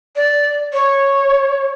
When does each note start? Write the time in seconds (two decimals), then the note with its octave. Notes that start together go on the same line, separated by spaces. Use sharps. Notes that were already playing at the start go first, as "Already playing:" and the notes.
0.16 D5
0.73 C#5